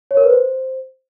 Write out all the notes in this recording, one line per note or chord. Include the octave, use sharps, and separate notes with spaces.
C#5
A#4
B4
C5